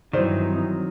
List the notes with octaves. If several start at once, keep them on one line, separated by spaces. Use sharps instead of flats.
G2 D#3 E3 F#3 C4 D#4 C5 D5